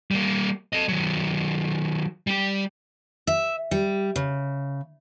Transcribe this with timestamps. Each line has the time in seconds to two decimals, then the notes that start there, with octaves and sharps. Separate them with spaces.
0.11 G3 A#3
0.73 A4 D#5
0.88 D#3 F#3
2.27 G3 G4
3.27 E5
3.71 G3
4.16 C#3